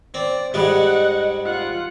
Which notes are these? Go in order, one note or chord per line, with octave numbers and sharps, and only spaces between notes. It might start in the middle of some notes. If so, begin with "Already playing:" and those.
C4 D5
G#2 G3 G#3 D#5 F#5
F4 F#5